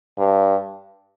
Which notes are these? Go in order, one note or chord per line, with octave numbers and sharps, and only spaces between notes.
G2